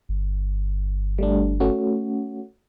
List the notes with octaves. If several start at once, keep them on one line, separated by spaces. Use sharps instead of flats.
G1
G3 A3 D4
A3 C#4 F#4